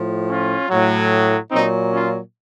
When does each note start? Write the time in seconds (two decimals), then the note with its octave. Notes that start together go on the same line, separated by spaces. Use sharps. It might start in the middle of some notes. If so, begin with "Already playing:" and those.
Already playing: A2 F3
0.28 C#4 F4
0.69 A2 F#3
1.51 A#2 F#3 C4 D#4
1.92 C#4 F4